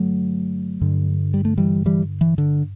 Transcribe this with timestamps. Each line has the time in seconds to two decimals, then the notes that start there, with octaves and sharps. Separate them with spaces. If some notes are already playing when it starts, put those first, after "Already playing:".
Already playing: G2 D3 F#3 A3
0.81 G2 D3
1.34 G3
1.45 A3
1.58 E3 G3
1.86 E3 G3
2.21 E3
2.38 D3